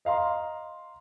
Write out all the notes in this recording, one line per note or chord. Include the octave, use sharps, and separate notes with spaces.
D#5 F5 A#5 C6